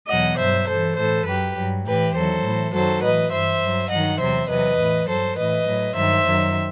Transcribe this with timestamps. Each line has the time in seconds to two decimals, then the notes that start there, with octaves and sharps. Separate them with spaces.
0.09 E2 B2 F#3 D#5 F#5
0.38 G2 F#3 C5 E5
0.67 G2 E3 A4 C5
0.97 A2 E3 A4 C5
1.26 F#2 F#3 G4 B4
1.56 G2 F#3
1.85 A2 E3 G4 B4
2.14 E2 D#3 F#3 A4 C5
2.43 A2 E3
2.72 F#2 D#3 F#3 A4 C5
3.02 A2 E3 B4 D#5
3.31 G2 E3 C5 E5
3.60 G2 F#3
3.89 G2 D#3 F#3 D#5 F#5
4.18 E2 C3 F#3 C5 E5
4.48 E2 C3 F#3 B4 D#5
4.78 A2 E3
5.07 G2 F#3 A4 C5
5.36 A2 E3 B4 D#5
5.65 A2 F#3
5.94 G2 D#3 F#3 C5 E5
6.24 F#2 D#3 F#3